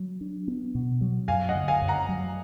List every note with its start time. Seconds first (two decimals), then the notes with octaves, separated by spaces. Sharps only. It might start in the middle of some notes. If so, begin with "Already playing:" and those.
Already playing: F#3
0.21 D4
0.48 B3
0.75 B2
1.01 F#3
1.28 F#2 F5 G#5
1.49 D#5 F#5
1.55 D3
1.68 F5 G#5
1.82 F#2
1.88 F#5 A#5
2.09 F#3